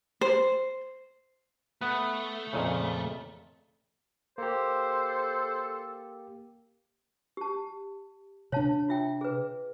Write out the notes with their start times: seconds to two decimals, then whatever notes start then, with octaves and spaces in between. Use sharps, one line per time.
0.21 C5
1.81 A3 B3 B4
2.53 F2 A#2 C#3
4.38 A#3 G4 A4 C5
7.37 G4 A5
8.52 C3 D4 C#5 F5 A5
8.89 F4 E5 G5
9.21 G#4 B4